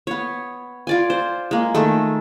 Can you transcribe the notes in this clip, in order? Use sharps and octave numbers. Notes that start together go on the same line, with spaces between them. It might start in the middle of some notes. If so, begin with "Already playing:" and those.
B3 C#5
F4 D5 G#5
C5
G#3 A#3
D#3 G#3 A3